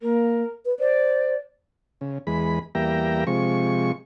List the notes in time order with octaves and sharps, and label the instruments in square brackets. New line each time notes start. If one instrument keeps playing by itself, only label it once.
[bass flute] A#3 [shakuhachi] A#4
[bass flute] B4
[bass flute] C5 [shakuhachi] D5
[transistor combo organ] C#3
E2 G#3 B5
E2 G3 A#3 E5 G5 A#5
C3 F3 G#3 C#6